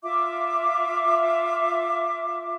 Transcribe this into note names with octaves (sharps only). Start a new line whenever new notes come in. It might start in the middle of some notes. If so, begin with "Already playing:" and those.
F4 E5 D6